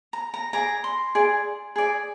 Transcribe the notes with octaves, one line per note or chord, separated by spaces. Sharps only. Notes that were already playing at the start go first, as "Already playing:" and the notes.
A#5
A#5
G#4 D5 A#5
C6
G#4 D5
G#4 D5